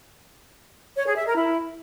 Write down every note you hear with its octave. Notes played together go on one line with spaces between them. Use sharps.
C#5
G#4
E5
A#4
E4